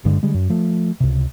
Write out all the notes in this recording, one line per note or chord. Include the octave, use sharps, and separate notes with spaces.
F#1 G2 D3 G#3
D3 G3 G#3
F#2
F3 A3
C#2 C3